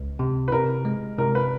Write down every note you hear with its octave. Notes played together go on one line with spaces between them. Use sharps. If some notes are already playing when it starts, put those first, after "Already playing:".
Already playing: C#2
C3
B4
C3 A#4
G#3
C3 A#4
B4